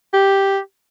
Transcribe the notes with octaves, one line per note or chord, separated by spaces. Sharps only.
G4